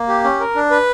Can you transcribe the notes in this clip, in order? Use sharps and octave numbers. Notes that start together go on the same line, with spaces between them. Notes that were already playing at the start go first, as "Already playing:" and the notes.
Already playing: A#3
G4
C#4
A#4
D4
B4